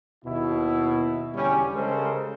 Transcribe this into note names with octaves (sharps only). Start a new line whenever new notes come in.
D#2 B2 E4
E2 D3 G3 C#4
C#3 G3 G#3 A4 A#4 C5